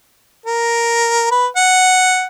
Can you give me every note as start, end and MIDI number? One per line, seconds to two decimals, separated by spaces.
0.46 1.30 70
1.31 1.47 71
1.56 2.27 78